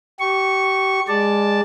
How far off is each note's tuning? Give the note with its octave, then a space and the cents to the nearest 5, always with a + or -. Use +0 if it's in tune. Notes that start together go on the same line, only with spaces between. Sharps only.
G4 -35 C#6 -5
G#3 -20 D5 +0 A5 +0